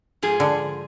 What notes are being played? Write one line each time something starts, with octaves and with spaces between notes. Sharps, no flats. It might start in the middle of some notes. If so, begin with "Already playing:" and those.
G#2 F3 G#4
D3